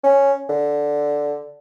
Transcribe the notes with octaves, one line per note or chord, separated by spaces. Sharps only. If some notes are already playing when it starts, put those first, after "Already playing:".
C#4
D3